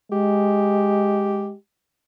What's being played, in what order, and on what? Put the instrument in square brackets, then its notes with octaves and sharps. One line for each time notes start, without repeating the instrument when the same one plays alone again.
[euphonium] G#3 [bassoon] G4